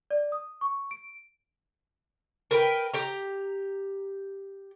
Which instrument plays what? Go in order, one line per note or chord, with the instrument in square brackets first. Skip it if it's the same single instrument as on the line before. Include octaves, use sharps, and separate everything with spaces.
[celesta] D5
D#6
C#6
D7
[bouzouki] A#4 B4 G5
G4 A#5